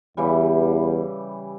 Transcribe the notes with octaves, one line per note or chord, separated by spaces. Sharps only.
E2 C#3 E3 G3